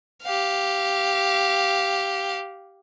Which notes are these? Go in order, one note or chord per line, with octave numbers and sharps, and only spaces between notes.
G4 F5